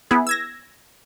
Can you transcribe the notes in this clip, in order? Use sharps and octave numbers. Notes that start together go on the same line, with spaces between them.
B3 E4 G#4
E6 G#6 A#6